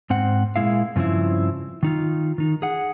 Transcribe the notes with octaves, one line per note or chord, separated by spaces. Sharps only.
G#2 C4 F#5
A#2 G3 G#3 E4 F5
G2 C#3 F3 C4 E4
D#3 D#4 F4
D#3 D#4
G#4 F#5